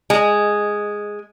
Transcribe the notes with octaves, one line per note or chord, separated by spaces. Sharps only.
G#3